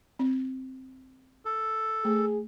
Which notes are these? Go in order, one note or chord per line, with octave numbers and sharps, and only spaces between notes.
C4
A4
A3 G#4